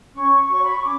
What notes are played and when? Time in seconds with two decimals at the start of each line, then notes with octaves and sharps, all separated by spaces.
0.14 C#4 C#6
0.48 F#4 C#5 C#6
0.61 B5
0.72 C#6
0.82 C#4 D6